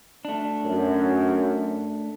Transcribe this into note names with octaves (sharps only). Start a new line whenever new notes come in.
A3 D4
F#2